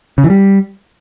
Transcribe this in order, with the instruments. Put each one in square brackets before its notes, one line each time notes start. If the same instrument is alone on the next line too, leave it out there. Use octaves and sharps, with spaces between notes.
[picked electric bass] C#3
E3
G3